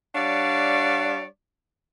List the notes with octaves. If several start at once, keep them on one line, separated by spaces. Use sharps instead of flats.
G3 D4 C#5 D5 F5 F#5